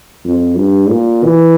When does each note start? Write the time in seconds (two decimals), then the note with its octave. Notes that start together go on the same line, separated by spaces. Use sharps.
0.25 F2
0.58 G2
0.90 A#2
1.24 E3